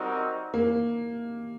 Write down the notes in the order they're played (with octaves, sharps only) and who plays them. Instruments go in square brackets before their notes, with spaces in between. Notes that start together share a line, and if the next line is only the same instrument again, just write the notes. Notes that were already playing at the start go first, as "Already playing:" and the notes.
Already playing: [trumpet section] G3 C4 D#4 F#4 A#4
[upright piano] A#3